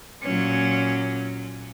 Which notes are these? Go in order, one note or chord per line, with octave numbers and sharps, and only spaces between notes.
A#2 F#3 C#4